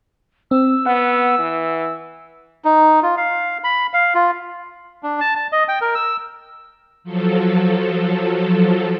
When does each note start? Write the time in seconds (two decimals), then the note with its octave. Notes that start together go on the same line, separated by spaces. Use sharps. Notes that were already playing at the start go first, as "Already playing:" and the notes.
0.51 C4 E6
0.86 B3 F#5
1.39 E3
2.65 D#4
3.03 F4
3.17 F5
3.64 B5
3.94 F5
4.15 F4
5.03 D4
5.21 A5
5.36 A5
5.52 D#5
5.68 G5
5.81 A#4
5.95 E6
7.04 F3 F#3 A4